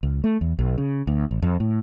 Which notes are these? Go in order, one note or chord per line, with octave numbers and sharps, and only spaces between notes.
C#2
A3
E2
B1
C#3
D2
A1
F2
A2